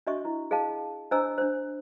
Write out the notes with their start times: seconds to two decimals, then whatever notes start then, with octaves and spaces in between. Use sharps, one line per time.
0.07 D4 F#4 D#5 E5 C#6
0.25 E4
0.51 G#4 D#5 F5 A5
1.11 D4 C5 D#5 G#5 A#5 E6
1.38 D4 C5